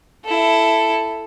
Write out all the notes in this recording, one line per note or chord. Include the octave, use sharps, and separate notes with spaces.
E4 A4